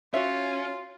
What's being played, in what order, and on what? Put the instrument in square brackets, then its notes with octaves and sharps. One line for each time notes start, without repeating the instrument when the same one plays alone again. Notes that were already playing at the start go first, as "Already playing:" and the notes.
[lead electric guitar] C#4 [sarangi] F4 [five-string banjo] F#4 C#5 E5